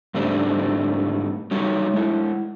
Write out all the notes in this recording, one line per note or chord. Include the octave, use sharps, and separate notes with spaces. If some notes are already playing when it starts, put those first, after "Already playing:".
G#2 G3 A3 C4 D4
F#3 G3 D#4 C#5
G#3 E4